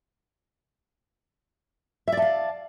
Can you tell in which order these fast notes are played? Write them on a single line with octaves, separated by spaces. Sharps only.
E5 D5 A5 F5